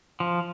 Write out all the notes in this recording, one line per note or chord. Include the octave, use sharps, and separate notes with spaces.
F3